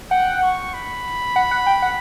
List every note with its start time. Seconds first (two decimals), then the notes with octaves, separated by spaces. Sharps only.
0.11 F#5 G5
0.43 C#6
0.74 B5
1.36 F#5
1.51 F#5
1.67 G5
1.82 F#5